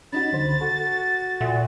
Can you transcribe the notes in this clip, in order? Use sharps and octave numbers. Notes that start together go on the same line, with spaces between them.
C#4 D#4 F#4 B5 A6
C#2 D3 C5
F#4 A4
A#2 A4 E5 F#5